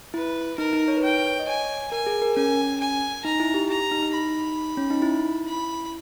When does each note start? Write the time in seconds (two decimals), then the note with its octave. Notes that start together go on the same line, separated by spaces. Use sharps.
0.14 E4 B4
0.58 D#4 A#4
0.73 D#4
0.88 C#5
0.97 B4
1.03 C#5 G5
1.39 D#5
1.47 C#5 G#5
1.92 A#4 G#5
2.07 G#4
2.22 A#4
2.36 C#4 G#5
2.80 G#5
3.25 D#4 A#5
3.40 E4
3.54 G4
3.69 G4 A#5
3.80 G4
3.92 D#4
4.02 D#4
4.14 B5
4.77 C#4
4.90 D#4
5.02 E4
5.47 B5